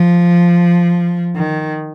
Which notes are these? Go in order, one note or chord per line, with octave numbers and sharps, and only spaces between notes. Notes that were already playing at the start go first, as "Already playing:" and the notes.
Already playing: F3
D#3